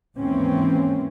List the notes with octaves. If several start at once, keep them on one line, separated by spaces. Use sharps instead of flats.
D#2 G#2 E3 A#3 C4 C#4